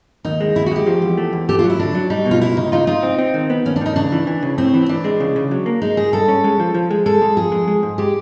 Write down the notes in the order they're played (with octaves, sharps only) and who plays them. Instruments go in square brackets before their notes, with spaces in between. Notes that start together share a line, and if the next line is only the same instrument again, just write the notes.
[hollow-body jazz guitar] D#2 [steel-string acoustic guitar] D#4
[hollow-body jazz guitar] G#3
[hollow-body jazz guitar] D#2 [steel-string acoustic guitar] E4
[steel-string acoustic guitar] F#4
[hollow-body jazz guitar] G#3 [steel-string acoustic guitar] G4
[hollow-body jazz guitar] F3
E2
A3
E2
[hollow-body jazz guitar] A3 [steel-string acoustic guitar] G4
[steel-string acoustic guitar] F4
[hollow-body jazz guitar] F#3
[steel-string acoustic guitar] E4
[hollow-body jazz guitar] D3 [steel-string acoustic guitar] D4
[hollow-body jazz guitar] F#3
[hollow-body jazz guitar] G3 [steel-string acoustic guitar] D#4
[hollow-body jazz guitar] B2
[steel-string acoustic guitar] F4
[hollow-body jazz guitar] C#2 [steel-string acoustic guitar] E4
[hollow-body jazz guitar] C#2 [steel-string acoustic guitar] D#4
[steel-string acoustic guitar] D#4 [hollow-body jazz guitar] F4
[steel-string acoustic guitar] D#4 [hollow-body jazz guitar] F4
[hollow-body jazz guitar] C4
C4
D#3
B3
[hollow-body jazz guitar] D#2 [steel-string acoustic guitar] C#4
[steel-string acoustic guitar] D4
[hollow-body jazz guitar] D#3 [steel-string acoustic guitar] D#4
[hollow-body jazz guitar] C#3 [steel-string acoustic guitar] D4
[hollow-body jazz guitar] E3
E3
C#3
[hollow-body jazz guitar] A2 [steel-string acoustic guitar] C4
[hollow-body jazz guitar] E3
[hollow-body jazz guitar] E3 [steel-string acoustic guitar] D4
[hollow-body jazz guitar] G#3
C#3
C#3
F#3
A#3
[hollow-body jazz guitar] G#3 [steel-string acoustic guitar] D#4
[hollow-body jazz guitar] G#3 [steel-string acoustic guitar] G#4
[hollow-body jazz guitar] G2 [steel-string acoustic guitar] A4
[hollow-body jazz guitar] C#4
G#3
F3
F3
G#3
[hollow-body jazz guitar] G#3 [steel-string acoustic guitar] A4
[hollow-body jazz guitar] G#3
[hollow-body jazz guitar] F2 [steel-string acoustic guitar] G#4
[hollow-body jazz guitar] G#3
G#3
G#2
[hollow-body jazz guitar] G#3 [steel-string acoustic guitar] G4